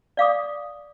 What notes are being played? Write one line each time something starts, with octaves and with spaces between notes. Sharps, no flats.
D5 F5 D6 D#6